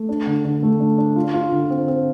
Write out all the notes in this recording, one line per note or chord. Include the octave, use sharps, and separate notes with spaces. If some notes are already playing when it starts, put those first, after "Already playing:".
Already playing: A3
D4
D3
D3
A3
D4
D4
F4
F4
D3
C4
C4